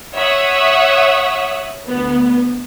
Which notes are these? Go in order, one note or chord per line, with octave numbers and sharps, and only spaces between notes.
C#5 E5 F#5 C#6 D#6
D2 B3